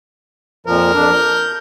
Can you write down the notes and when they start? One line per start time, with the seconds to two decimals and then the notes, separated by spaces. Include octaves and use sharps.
0.66 F2 A#2 F3 A#4
0.94 F2 D4
1.13 G6